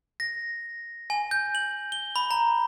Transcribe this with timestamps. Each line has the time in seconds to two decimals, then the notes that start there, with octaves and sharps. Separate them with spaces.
0.20 A#6
1.10 G#5
1.31 G6
1.55 F#7
1.92 G7
2.16 B5
2.31 A#5